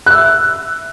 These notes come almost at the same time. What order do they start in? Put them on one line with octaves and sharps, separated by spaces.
F#6 E6 E5